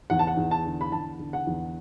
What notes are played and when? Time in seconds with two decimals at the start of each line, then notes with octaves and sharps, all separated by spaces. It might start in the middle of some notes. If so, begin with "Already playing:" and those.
0.10 E2 F#5
0.19 A5
0.27 F#5
0.37 E2
0.51 A5
0.66 D3
0.81 B5
0.92 E2 A5
1.19 D3
1.33 F#5
1.47 E2